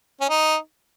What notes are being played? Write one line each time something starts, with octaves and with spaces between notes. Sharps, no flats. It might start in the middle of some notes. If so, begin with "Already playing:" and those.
C#4
D#4